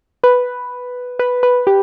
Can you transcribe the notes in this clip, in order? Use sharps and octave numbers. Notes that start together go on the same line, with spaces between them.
B4
B4
B4
G4